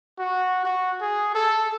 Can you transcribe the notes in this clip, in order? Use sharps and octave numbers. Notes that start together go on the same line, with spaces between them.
F#4
F#4
G#4
A4